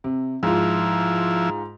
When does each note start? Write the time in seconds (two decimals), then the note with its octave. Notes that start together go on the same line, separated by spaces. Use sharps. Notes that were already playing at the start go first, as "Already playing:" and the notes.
0.04 C3
0.43 G#2 F3 E4 F4